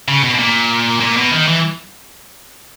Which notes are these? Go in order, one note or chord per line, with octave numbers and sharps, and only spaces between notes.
C#3
B2
B2
A#2
A#2
B2
D#3
E3